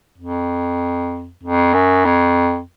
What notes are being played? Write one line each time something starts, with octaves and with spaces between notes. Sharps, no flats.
F2
F2
F#2
F2